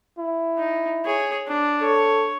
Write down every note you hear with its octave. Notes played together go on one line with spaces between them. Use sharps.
E4
D#4
G#4 C#5
D4
A4 C#5